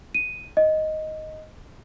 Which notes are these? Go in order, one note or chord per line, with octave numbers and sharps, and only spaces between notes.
D#7
D#5